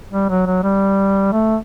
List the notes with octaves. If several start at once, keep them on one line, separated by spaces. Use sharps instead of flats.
G3
F#3
F#3
G3
A3